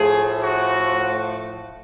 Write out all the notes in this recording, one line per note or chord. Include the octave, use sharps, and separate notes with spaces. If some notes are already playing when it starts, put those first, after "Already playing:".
Already playing: A2 F3 A3 G#4
F#4